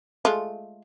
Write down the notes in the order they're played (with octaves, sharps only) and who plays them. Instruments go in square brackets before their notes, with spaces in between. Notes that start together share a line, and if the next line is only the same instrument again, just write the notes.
[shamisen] G#3 A3 F4